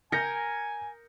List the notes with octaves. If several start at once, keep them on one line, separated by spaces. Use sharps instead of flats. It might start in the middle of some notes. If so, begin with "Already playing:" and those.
A#4 G#5 G6 A#6 C#7